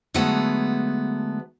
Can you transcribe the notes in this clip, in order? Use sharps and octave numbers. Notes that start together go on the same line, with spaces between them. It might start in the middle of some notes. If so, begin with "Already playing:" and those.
D3 F#3 G#3 A3 B3